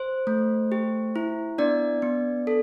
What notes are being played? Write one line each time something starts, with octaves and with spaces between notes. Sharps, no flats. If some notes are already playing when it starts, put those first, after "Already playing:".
Already playing: C5
A3
G4
E4
B3 D4 D5
B3
A4